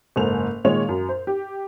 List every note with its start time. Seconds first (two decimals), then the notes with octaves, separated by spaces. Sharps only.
0.16 F#1 G#2 A4 C5 G#5 F7
0.64 A#2 D#3 G#3 C#5 F7
0.89 F#2
1.09 C5
1.27 G4